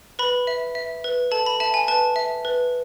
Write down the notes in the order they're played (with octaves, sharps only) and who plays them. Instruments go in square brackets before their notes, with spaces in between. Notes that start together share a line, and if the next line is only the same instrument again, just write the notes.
[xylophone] B4 B5
E5
E5
B4
A4 A5
B5
E5 A5
G#5
B4 A5
E5
B4